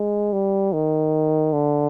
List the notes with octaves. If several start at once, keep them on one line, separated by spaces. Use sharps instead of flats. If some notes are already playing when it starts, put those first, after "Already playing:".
Already playing: G#3
G3
D#3
D3